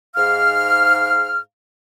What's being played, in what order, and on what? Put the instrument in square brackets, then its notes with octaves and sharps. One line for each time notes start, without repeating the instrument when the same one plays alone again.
[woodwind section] G#2 F5 F6